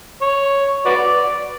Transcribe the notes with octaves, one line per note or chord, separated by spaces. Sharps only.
C#5
F#4 B4 D5